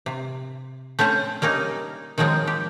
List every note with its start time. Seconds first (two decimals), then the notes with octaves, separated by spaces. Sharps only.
0.06 C3
0.99 A3 C4 C#4 C5
1.42 G3 A#3 C#4 D#4
2.18 D#3 F3 F#3 G#3 C4
2.47 G4